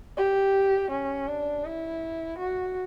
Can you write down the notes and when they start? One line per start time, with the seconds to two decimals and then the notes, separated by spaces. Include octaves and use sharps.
0.17 G4
0.91 C#4
1.28 D4
1.65 E4
2.39 F#4